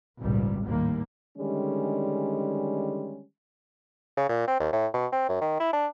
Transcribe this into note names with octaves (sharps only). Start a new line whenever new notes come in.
G#1 C#2 A#2 G3
D#2 A2 G3 A#3
D3 D#3 G3 G#3 C#4
C#3
A#2
C4
D#2
A2
B2
C4
F#2
D#3
E4
D4